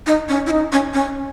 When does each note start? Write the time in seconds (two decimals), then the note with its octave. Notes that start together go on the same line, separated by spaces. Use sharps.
0.07 D#4
0.29 C#4
0.47 E4
0.51 D#4
0.72 C#4
0.94 C#4